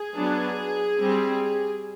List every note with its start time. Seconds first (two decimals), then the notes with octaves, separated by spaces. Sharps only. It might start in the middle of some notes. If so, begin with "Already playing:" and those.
Already playing: G#4
0.14 F#3 B3 D4
1.01 G3 C4